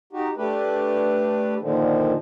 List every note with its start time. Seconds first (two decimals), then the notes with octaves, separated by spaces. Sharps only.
0.13 D#4 F#4 G4
0.37 A3 D4 G4 B4
1.60 A#2 D3 D#3 F3